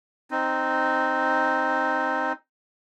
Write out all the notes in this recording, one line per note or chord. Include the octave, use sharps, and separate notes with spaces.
C4 D#4